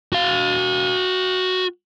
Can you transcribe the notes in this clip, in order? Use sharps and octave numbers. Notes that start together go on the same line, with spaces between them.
F#4 F5